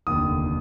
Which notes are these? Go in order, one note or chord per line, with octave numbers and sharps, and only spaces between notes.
F1 D#2 D3 D#6